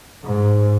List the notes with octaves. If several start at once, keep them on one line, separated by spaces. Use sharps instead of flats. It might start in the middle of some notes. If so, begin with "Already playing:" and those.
G#2